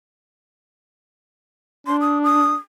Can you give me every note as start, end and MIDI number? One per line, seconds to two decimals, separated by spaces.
1.87 2.56 62
1.87 1.96 84
2.01 2.18 87
2.24 2.53 87